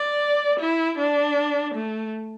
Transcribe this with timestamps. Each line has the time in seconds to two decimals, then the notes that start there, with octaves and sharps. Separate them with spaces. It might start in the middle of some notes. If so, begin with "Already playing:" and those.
Already playing: D5
0.59 E4
0.98 D4
1.75 A3